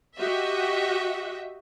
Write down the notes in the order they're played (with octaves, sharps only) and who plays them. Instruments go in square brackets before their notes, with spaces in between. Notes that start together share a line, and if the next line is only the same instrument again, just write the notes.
[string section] F#4 G4 D#5 E5